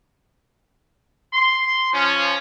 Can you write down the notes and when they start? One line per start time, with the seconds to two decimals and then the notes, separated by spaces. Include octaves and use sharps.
1.34 C6
1.93 F3 C#4